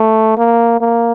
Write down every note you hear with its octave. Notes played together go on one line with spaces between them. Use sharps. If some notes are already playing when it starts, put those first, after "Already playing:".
Already playing: A3
A#3
A#3